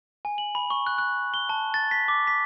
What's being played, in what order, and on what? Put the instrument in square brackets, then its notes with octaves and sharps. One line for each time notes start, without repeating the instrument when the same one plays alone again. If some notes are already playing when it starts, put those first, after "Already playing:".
[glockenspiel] G#5
F#7
B5
C#6
F#6
F#6
G7
A5
A6
B6
D6
B6